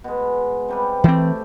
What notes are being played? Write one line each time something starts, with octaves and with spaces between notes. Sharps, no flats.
B2 G#3
C3 G3 B4
E3 A3 C4 G4